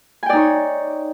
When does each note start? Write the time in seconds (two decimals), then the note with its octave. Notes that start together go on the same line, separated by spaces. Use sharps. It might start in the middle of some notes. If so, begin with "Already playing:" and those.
0.23 G#5
0.26 G5
0.29 D5
0.33 D#4
0.36 C#5